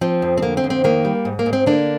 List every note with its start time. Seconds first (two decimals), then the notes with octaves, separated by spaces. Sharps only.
0.01 F3 C4
0.22 F2
0.37 C4
0.42 D3 A#3
0.57 C4
0.64 F2
0.70 C4
0.84 D#3 A#3
1.05 G3
1.25 G#2
1.39 A#3
1.46 G#2
1.53 C4
1.66 D3 A#3 D4